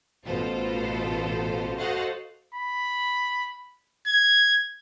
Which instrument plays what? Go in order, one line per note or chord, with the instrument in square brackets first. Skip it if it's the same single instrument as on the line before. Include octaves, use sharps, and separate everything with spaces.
[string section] A1 B2 F4 A4 C5
F#4 A4 C5 D#5 F5 F#5
[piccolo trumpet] B5
G#6